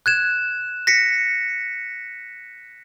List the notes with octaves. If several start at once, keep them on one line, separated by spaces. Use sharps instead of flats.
F#6 G#6 E7
A#6 B6 C#7